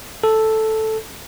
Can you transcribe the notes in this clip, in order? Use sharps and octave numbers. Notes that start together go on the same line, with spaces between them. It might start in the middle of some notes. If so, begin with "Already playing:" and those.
A4